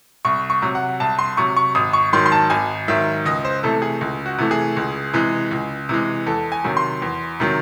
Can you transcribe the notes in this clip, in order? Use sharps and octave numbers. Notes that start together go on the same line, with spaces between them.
C2 C#6
C#6
C3 F#3
F#5
C2 A5
C6
C3 F#3 C#6
C#6
G#1 D#6
C#6
G#2 D#3 F#3 C6
C6
A5
G#1 G#5
G#2 D#3 F#3 E5
C#2 D#5
C5
C3 E3 A3 A4
G#4
C#2
F#4
C3 E3 A3
G#4
C#2
C3 E3 G#3
C#2
C3 E3 G#3
E2 A4
G#5
C3 D#3 F#3
C6
E2
C3 D#3 F#3